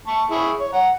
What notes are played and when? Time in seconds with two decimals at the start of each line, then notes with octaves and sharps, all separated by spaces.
0.07 A5 C#6
0.31 E4 G#4 C#6
0.59 C#5
0.72 F#5 A#5